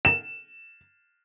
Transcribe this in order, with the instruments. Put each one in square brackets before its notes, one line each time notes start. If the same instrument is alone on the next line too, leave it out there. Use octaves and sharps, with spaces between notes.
[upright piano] E7